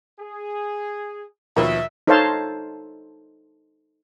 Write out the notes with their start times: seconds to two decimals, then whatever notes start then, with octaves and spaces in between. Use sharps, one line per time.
0.20 G#4
1.56 D#2 B2 F3 A#4 B4 C#5 E5
2.07 D#4 A4 C5 C#5 F5 A5